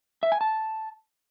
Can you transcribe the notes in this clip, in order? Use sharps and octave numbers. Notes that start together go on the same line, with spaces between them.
E5
G#5
A5